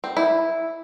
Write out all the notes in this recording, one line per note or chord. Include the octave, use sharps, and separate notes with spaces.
C4
E4